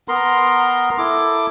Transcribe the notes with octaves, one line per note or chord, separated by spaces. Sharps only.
B3 A#4 A#5 C6
E4 A4 D6